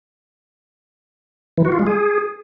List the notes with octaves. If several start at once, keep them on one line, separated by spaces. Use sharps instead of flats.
E3
F#4
F4
G#3
G#4